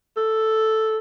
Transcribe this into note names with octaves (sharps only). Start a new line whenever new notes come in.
A4